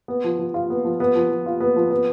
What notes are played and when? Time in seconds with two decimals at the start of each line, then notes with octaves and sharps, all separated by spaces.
0.08 B3
0.24 F3
0.39 F3
0.54 F4
0.70 B3
0.85 F3
1.00 B3
1.15 F3
1.30 F3
1.46 F4
1.60 B3
1.76 F3
1.91 B3